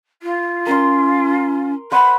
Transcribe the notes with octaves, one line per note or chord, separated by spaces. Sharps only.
F4
C#4 A#4 C6
C5 F#5 B5